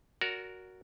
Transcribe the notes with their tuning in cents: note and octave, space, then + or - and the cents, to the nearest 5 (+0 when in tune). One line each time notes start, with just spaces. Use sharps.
F#4 +0 A#4 +0 D5 -40